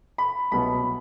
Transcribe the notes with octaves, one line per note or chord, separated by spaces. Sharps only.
B5
C2 B2 F#3 B3 B5